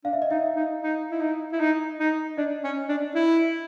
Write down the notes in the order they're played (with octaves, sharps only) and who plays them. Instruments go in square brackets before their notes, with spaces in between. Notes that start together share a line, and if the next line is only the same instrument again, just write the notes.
[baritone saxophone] D4 [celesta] F5
[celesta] E5
D#5
[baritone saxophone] D#4 [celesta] E5
[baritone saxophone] D#4
D#4
E4
D#4
E4
D#4
D#4
[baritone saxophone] D4 [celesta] D#5
[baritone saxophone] C#4
D4
E4